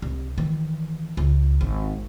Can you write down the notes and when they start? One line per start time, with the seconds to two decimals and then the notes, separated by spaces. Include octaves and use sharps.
0.02 C2
0.38 D#3 E3
1.17 C#2
1.61 G#1